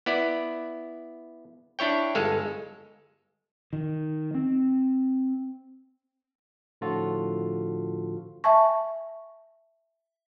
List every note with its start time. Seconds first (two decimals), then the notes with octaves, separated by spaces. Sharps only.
0.06 B3 E4 D5
1.79 D4 E4 C#5 G5
2.15 G1 G#3 A4 F5
3.73 D#3
4.34 C4
6.81 A2 D3 F3 F4 F#4 A4
8.44 E5 G#5 A5 C#6